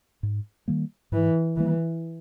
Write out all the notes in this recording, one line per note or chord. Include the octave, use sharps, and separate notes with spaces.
G#2
D#3 G3 A#3
G#2 E3
D#3 E3 G3 A#3